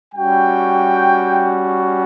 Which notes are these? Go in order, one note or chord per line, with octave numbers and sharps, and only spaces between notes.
G3 C#4 F#4 G5